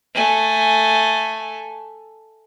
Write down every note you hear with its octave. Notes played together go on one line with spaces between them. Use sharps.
A3 G#5